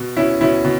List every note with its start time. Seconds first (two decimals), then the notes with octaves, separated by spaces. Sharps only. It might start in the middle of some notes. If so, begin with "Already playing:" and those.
Already playing: B2
0.17 B2 C#4 E4
0.41 B2 C#4 E4
0.65 B2